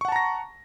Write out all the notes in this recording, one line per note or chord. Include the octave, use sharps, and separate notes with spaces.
F#5 A5 A#5 C#6 A#6